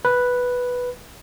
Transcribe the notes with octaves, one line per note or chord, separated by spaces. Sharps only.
B4